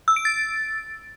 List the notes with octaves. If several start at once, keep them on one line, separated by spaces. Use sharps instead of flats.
E6
D7
A6